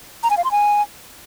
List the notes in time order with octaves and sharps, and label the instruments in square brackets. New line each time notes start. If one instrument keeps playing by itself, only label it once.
[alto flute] A#5
G#5
F5
C6
G#5